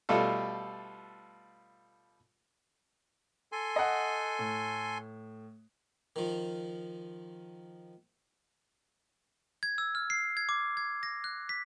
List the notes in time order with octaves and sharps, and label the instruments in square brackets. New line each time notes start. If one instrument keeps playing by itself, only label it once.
[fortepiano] B2 G3 A3 F4 A4
[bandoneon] A4 G#5 C6
[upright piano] D#5 F#5
A2
[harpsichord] D#3 F3
[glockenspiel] G#6
E6
F6
C7
G#6
D6
G#6
A#6
F#6
B6